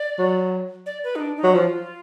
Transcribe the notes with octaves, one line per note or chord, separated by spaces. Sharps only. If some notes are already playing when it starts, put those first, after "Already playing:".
Already playing: D5
F#3
D5
B4
D#4
D4
D#4
F#3
F3 F4